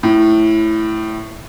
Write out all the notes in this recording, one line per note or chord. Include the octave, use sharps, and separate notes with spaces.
A2